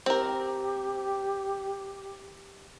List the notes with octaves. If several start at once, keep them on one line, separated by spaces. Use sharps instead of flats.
C4 G4 A#4